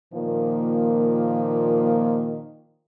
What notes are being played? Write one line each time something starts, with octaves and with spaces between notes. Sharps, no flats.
A#2 D#3 F3 A#3